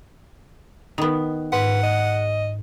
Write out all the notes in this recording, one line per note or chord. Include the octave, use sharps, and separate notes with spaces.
D#3 B3 D#4
G#2 B4 F#5
D#5